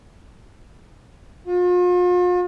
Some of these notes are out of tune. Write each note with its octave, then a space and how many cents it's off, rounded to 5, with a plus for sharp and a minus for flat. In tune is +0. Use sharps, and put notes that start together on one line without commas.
F4 +40